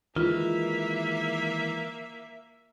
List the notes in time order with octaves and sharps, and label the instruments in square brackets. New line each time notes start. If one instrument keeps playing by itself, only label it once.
[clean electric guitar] D#3 E3 G#3 [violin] A#3 E5 [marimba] F4